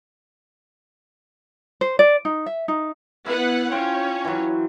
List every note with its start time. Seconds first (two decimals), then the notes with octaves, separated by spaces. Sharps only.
1.81 C5
1.99 D5
2.25 D#4
2.46 E5
2.68 D#4
3.26 B3 E4 B4 F#5
3.72 C#4 F4 C5 C#5 G5
4.25 E3 F#3